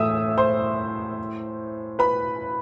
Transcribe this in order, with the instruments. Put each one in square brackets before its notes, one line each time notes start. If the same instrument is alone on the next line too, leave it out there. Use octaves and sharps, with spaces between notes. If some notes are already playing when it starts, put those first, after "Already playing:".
Already playing: [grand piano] A2 E3 A3 [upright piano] E5 D#6 E6
[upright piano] C5 C6
B4 B5